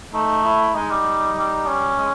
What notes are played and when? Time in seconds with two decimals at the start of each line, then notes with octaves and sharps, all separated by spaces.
0.14 A3 D#4
0.44 E4
0.74 G#3 D#4
0.90 G3
1.36 G3
1.67 C#4
1.98 G#3